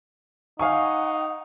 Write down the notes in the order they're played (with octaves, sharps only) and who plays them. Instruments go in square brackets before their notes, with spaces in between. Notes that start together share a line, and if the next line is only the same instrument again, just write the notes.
[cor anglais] D#4 [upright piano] F5 G#5 C#6 [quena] F#5